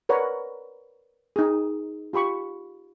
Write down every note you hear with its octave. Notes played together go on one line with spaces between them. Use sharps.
A#4 B4 C#5 D5 F#5 A#5
D#4 G#4
F4 G4 B5 C#6